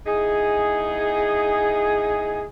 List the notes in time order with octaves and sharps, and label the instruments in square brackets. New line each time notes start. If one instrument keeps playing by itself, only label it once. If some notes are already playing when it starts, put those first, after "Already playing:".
[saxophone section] E2 D#4 G#4